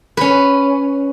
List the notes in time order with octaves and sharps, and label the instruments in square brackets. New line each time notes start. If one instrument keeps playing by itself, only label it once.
[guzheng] C#4 B4